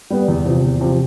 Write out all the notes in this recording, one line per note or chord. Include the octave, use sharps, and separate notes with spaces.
G3 B3
E2
C3 F3
E2
C3 F3